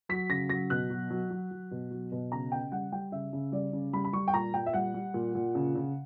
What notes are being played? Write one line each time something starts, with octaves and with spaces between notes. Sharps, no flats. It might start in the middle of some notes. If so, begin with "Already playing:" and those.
F#3 B6
C#3 A#6
F#3 A#6
B2 F#6
F#3
F#3
F#3
F#3
B2
F#3
B2
C#3 A#5
C#3 G5
G3 F#5
G3 G5
C#3 E5
C#3
G3 D5
C#3
G3 B5
B5
G3 C#6
G5
A#2 A#5
A#2 G5
E5
G3 F#5
G3
A#2
A#2
C#3
C#3